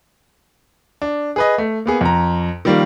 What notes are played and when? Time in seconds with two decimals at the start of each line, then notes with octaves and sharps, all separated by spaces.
1.02 D4
1.36 G#4 B4 D#5
1.58 A3
1.86 A#3 B3 G#4
2.01 F2 A#5
2.65 D#3 F3 G3 A#3